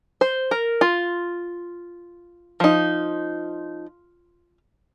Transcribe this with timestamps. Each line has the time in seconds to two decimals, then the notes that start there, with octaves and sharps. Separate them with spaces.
0.21 C5
0.51 A#4
0.81 F4
2.60 F3 D#4